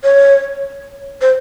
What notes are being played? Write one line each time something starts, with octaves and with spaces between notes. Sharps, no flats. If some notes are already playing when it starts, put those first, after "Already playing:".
C#5
C5